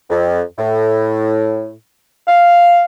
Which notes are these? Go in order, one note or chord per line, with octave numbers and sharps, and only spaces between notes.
F2
A2
F5